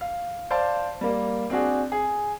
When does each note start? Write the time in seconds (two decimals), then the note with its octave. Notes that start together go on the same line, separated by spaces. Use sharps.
0.01 F5
0.51 C5 D5 F5 A5 C6
1.01 G3 A#3
1.50 C4 D4 F#4 G#4
1.92 G#4